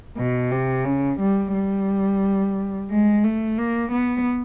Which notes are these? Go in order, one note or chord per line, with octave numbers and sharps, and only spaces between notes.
B2
C3
C#3
G3
G3
G#3
A3
A#3
B3